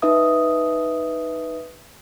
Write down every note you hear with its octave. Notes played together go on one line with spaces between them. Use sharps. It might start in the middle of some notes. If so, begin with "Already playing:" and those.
D#4 B4 E5 D#6